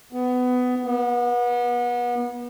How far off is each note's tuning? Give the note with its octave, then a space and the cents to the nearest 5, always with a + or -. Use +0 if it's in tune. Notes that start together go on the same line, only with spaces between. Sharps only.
B3 +20
B3 -30